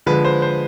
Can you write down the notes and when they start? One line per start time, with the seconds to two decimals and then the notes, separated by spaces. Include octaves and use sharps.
0.06 D3 F3 G#3 B4
0.25 C5
0.42 C5